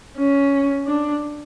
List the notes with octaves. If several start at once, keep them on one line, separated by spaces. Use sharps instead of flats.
C#4
D4